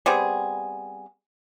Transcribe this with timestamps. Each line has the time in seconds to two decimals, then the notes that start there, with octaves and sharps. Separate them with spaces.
0.06 G3 B3 C4 G#4